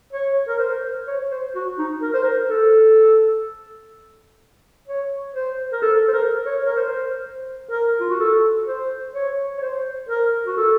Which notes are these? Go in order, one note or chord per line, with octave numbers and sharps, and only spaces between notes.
C#5
A#4
C5
C#5
C5
F#4
D#4
A#4
C5
A#4
A4
C#5
C5
A#4
A4
C5
A#4
C#5
A#4
C5
A#4
F4
F#4
A4
C5
C#5
C#5
C5
A#4
F#4
A4